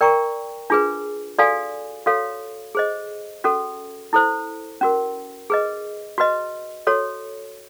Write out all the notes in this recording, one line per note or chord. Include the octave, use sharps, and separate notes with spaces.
A#4 D5 G5 A#5 C#6
D4 F4 G#4 B4
F#4 A4 D5 F5 G#5
F#4 A4 C#5 F5
G#4 C5 D#5
C#4 F#4 A4
E4 A4 C5
C#4 F#4 A#4
G#4 B4 D#5
F#4 B4 D#5
F#4 A4 C#5